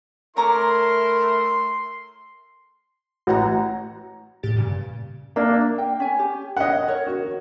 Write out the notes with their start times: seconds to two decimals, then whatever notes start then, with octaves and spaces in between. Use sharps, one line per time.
0.37 A3 E4 A#4 C#5 A#5 C6 D6
3.27 A1 F#4 F#5 A#5
4.43 A2 G4 A6
4.56 G2 A#2 C#3
5.36 A#3 D4 E5
5.78 G5
6.00 C#4 G#5
6.19 G4
6.57 A#4 C#5 D#5 F#5
6.88 A#4 C#5
7.07 F#4